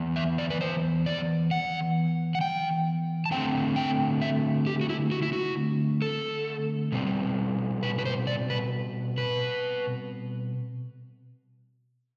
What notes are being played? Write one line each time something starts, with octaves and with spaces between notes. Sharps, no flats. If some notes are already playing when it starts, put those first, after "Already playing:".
Already playing: E3 B3
E5
D5
B4
C5
D5
F#5
F#5
G5
A5
D3 A3 C4 G5
G5
E5
G4
F#4
E4
F#4
E4
F#4
A4
B2 G3 C4
B4
B4
C5
D5
B4
B4